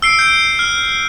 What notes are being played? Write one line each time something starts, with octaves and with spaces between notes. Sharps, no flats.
E6 C7 D7
G6 D7
F6